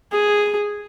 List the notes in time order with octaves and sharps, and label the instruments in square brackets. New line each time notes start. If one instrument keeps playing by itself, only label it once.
[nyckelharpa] G#4